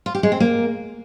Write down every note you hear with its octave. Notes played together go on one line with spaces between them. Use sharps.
F4
G4
G#3
C4
A#3